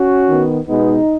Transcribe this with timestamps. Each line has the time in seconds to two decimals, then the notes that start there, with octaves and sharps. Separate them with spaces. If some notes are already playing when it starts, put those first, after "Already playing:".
Already playing: C#4 F#4
0.29 D#3 B3
0.67 B2 G#3 B3 D#4